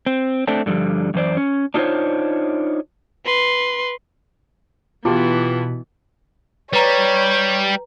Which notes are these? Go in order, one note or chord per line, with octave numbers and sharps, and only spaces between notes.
C4
A3 C4 D4
G2 D3 F3 G3
F#2 E3 C5 D5
C#4
D4 D#4 F4 G4 C5 C#5
B4 C6
B2 E3 B3 F4 G4 A5 D6
G3 B4 C#5 A#5